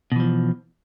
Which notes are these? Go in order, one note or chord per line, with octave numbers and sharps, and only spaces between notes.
B2 E3 F3